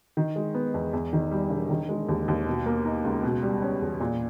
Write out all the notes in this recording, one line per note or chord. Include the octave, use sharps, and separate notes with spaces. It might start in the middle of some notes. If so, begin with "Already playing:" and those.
D#3
G#3
B3
E2
E2
D#3
G3
E1
D#3
G#3
D#2
D#2
B2
A#3
D#4
C#2
B2
G3
C#4
E2
A#2